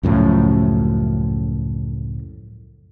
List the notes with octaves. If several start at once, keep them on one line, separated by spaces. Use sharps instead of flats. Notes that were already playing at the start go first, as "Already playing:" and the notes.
C#2 F#2 A2 F3